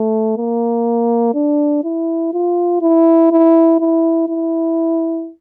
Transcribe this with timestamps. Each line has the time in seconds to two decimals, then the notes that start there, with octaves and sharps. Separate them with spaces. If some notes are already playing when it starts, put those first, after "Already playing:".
Already playing: A3
0.37 A#3
1.34 D4
1.84 E4
2.34 F4
2.82 E4
3.32 E4
3.80 E4
4.29 E4